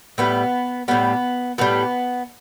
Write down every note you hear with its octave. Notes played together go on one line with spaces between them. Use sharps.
A2 G3 B3
A2 G3 B3
A2 G3 B3